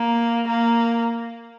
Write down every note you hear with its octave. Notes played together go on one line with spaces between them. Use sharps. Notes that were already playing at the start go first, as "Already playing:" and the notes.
Already playing: A#3
A#3